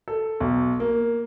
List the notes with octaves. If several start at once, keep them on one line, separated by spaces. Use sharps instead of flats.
A4
B1
A#3